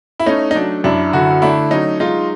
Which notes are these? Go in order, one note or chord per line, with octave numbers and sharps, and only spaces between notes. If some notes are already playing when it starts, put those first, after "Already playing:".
E4
A3 C#4 D#4
D#4
F#3 D4
F#2 D4 E4
D3 E4 F#4
A3 D4 E4
F#3 C#4 D#4
G#3 D#4 F4